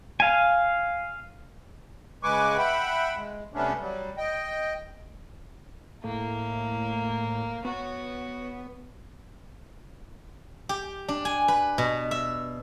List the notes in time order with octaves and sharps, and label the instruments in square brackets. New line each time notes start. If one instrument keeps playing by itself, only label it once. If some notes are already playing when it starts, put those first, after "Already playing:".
[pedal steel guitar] F5 G#5
[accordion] C#3 G#3 B4 G#5 C#6 D6
E5 F#5 G5 B5
G#3
C3 G3 A3 B3 C#4 D4
F#3 G3
D#5 G5
[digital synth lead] A2 [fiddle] A#3
[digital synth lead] B3 [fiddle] F#4 C#5
[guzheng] G4
D4
G#5
B4
B2
E5